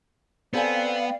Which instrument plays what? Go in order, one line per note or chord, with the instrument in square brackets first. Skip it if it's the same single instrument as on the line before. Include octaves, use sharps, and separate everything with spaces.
[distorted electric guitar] B3 [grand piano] C4 A4 G#5 [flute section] D5 F5 G5